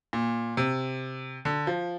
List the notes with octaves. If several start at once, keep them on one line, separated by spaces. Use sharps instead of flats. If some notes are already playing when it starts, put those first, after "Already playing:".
A#2
C3
D3
F3